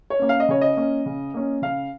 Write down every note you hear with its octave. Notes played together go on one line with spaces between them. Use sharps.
C#5
A#3 C#4
F5
D#5
C#3 C#5
D#5
A#3 C#4
C#3
A#3 C#4
C#3 F5